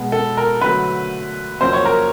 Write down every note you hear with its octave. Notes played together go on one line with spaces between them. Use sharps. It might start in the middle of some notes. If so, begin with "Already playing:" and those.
Already playing: B2 G#3 B3
A4
A#4
D3 F#3 A3 B4
F2 C#3 F#3 A#3 C5
C#5
A#4